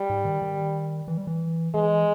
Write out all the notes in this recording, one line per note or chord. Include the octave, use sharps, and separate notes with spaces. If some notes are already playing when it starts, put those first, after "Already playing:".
Already playing: G3
G#2
D#3
D#3
E3
G3
E3
E3 G#3